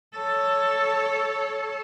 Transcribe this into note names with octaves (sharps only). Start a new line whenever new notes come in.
A4 C#5